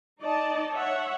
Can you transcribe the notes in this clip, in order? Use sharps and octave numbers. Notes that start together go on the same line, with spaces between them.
D#4 D5 D#5 A5
C#5 E5 F#5